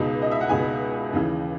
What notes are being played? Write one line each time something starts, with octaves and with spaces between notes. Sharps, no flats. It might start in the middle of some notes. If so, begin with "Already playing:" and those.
Already playing: C#2 B2 G#3 D#4
D#5
E5
F#5
C#2 B2 G#3 D#4 G#5
D#2 C#3 E3